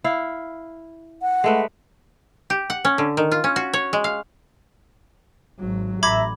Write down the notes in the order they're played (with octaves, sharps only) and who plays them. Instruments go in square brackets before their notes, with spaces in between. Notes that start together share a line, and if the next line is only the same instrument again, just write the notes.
[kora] E4 F5
[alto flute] F#5
[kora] G#3 A3 B4
[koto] G4
F#5
C#4
D3
D#3
F4
C#4
F#4
C#5
G#3
F5
[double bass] G#1 F#3
[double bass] A1 [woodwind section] E5 A#5 [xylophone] B5 D6 G#6